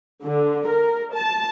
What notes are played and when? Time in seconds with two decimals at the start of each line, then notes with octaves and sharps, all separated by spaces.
0.24 D3
0.67 A#4
1.14 A5